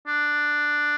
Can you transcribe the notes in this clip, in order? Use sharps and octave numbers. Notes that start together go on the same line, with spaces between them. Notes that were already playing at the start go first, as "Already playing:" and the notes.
D4